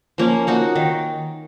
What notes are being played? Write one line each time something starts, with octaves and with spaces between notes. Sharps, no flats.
F3 A#3 C#4
A#3 D#4 F#4
D#3